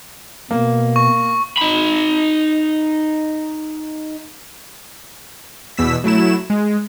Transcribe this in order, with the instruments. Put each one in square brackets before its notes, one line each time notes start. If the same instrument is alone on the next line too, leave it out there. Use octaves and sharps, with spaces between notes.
[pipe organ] B2 [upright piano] A#3
[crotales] C#6
[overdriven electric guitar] D#4 B5
[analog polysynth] E2 B2 E6 B6
F#3 A3 E4 E7
G#3